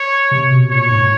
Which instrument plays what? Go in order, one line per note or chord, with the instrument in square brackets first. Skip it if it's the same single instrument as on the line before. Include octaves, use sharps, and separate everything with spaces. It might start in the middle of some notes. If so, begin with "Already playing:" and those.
Already playing: [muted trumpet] C#5
[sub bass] C3
B2
[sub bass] A#2 [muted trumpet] C#5
[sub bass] G#2